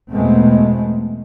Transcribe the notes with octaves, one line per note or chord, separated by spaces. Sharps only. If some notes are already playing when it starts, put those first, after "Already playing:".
E2 B2 G#3 A3 B3 C4